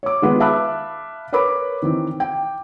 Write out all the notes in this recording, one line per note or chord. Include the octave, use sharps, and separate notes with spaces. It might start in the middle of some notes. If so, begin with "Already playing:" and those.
C#5 D6
D#3 G#3 B3 F4 B4
E5 F5 A5 B5 D6 F#6
A#4 B4 C#5 B5 D6
D#3 E3 C4
G5